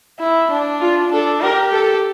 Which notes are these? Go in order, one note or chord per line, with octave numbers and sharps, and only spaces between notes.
E4
D4
F4
D4 A4
G4 A#4
A4